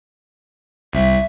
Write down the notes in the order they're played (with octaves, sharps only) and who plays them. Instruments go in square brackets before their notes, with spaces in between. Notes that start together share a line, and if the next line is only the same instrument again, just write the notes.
[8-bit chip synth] C2 [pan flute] E5